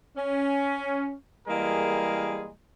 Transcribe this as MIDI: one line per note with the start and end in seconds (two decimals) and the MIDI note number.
0.16 1.14 61
1.47 2.50 52
1.47 2.50 55
1.47 2.50 56
1.47 2.50 58
1.47 2.50 68
1.47 2.50 70